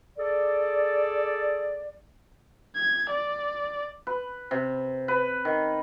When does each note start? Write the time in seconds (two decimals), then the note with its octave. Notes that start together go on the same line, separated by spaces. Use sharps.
0.18 G#4 A4 D5
2.76 G#6
3.10 D5
4.07 B4
4.51 C3
5.08 B4
5.45 D#3